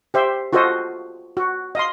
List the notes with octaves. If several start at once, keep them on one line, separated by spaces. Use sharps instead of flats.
G4 C5 E5
F4 F#4 A4 C5 D#5
F#4
D#5 F5 C6